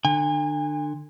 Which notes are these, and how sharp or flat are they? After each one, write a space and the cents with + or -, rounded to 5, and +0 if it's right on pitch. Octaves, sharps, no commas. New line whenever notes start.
D3 +30 G#5 -40